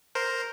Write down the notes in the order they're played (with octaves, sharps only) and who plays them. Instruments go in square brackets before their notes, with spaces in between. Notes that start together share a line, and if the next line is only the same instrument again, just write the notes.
[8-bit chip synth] A#4 C5